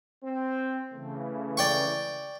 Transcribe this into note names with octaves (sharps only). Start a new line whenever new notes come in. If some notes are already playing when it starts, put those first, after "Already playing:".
C4
C#3 E3 A3
D5 G5 C#6